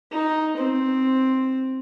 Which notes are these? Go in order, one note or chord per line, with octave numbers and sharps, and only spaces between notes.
D#4
C4